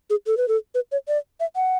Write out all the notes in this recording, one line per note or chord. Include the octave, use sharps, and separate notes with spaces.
G#4
A4
B4
A4
B4
C#5
D5
E5
F#5